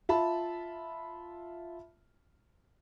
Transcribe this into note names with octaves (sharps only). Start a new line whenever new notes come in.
F4 E5 A5 B5